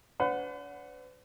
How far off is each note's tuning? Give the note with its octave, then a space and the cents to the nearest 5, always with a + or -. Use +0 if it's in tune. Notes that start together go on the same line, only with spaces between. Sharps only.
D4 -45 B4 +45 F#5 -10